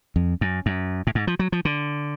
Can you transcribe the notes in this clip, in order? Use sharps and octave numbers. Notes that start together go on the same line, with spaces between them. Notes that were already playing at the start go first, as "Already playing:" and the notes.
F2
F#2
F#2
A2
G#2
F3
F#3
F3
D3